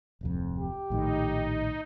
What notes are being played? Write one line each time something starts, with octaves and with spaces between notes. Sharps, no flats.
D1 C2 F2
G4
A#1 A2 D#3 D#4